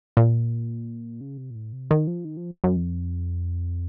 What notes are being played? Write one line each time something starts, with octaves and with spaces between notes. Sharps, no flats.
A#2
C#3
C3
A#2
A2
C3
D#3
F3
D#3
F3
F#2
F2